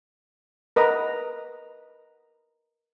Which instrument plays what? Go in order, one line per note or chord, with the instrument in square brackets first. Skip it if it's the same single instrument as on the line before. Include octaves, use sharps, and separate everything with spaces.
[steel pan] A#4 B4 D#5 F#5 A#5